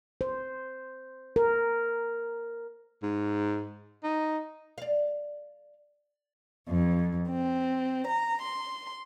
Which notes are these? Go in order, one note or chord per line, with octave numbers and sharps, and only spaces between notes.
C5
A#4
G#2
D#4
D5 F5
F2
C4
A#5
C6